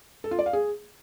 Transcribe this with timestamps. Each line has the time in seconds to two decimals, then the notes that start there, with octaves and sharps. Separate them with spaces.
0.24 A4
0.31 F4
0.39 D5
0.46 F5
0.53 G#4